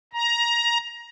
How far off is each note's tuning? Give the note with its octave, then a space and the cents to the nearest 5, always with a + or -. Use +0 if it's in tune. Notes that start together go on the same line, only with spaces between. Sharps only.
A#5 +15